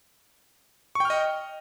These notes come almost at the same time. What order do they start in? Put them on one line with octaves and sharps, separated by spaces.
C#6 G5 F6 D#5